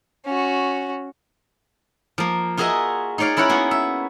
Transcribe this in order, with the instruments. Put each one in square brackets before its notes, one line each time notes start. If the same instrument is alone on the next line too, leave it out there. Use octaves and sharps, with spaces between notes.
[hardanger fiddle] C#4 F#4
[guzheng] F3 A#3
F4 F#4 G#4 A#4 D#5 E5
D#4 G#4 C#5 D5 F5
C#4 E4 A#4 C#5 F#5
A#3 B3 F#4
E5